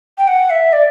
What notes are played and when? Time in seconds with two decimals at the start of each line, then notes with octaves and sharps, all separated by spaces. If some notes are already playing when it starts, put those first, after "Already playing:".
0.18 G5
0.28 F#5
0.50 E5
0.73 D5